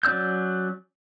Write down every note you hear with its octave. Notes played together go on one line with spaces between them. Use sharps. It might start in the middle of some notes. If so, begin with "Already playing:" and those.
F#3 C#4 D5 E6 G6